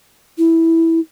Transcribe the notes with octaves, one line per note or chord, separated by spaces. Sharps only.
E4